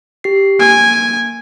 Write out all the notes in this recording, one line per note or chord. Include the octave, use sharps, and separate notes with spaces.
G4 C7
A#3 G#5 D7